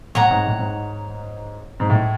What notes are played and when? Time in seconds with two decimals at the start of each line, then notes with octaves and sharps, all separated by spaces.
0.15 A2 C#5 F#5 A#5
0.30 G#2
0.47 A2
0.59 G#2
1.80 G#2
1.90 A2